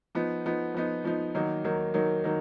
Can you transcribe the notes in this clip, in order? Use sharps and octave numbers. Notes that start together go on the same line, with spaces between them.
F3 B3 D#4
F3 B3 D#4
F3 B3 D#4
F3 B3 D#4
D#3 F#3 A#3 D#4
D#3 F#3 A#3 D#4
D#3 F#3 A#3 D#4
D#3 F#3 A#3 D#4